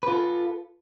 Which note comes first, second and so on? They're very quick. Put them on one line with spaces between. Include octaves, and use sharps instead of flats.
B4 F4 A4